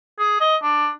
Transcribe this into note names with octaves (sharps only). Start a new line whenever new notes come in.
G#4
D#5
D4